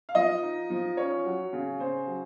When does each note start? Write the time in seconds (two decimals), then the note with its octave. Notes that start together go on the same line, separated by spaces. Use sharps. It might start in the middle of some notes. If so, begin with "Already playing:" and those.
0.09 F5
0.15 F3 D#5
0.42 D#4
0.70 F3
0.97 C#4 C#5
1.25 F#3
1.53 C#3
1.80 C#3 C5
2.07 F#3